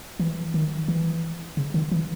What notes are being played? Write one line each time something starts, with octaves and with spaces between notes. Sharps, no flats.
E3
D#3
E3
C#3
D#3
E3